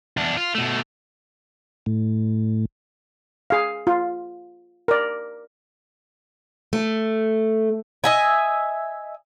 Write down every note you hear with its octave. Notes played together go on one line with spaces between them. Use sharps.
E2 D4
F4
B2 A3
A2
G#4 F5
F4
A#4 D5
A3
D#5 E5 G#5